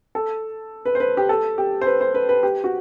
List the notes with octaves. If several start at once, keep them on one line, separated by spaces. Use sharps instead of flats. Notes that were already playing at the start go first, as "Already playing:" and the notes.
A4
B4
C5
B4
G4
A4
G4
C5
B4
C5
B4
B4
G4
F#4